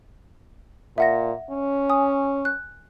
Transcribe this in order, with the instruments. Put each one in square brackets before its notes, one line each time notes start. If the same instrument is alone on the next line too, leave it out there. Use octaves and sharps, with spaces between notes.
[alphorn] A#2 [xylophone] E5 F#5 A#6
[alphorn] C#4
[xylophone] G#5 D#6
F#6